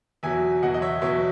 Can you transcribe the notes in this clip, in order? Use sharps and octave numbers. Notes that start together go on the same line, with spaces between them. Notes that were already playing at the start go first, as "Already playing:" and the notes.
E2 B2 F#3 E5 G#5
E2 B2 F#3 D#5 F#5
D#5
C#5 E5
E2 B2 F#3 C#5 E5